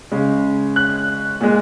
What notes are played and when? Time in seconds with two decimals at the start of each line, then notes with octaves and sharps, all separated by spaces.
0.12 C#3 G#3
0.76 F#6
1.41 A#2 G#3